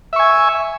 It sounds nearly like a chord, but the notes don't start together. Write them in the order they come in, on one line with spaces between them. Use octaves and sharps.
E5 C#6 G#5